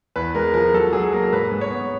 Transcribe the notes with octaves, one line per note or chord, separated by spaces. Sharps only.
E2 B4
G#3 A#4
F3 A#4
F#3 A4
F#3 G#4
A#3 A#4
G#2 B4
G#2
C#5
B3